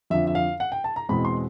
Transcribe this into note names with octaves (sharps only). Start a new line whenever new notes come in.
F2 D3 F3 E5
E5
F5
F#5
G5
A5
A#5
E2 B2 G#3 C4 B5
C6